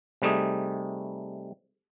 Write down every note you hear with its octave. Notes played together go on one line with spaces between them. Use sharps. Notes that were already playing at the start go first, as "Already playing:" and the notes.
C3 G3 A3 D#4 G#4